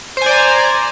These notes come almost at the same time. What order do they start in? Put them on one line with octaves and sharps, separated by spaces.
C5 G#5 D5 A#5